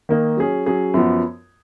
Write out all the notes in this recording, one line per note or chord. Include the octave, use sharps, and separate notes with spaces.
D#3 A#3 D#4
F#3 C#4 G#4
F#3 C#4 G#4
F#2 F3 B3